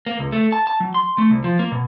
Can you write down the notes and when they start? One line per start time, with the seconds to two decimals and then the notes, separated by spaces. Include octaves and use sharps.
0.06 A#3
0.19 C#2
0.32 A3
0.52 A5
0.67 A5
0.80 F#3
0.94 C6
1.18 A3
1.30 C2
1.44 F3
1.59 A#3
1.72 B2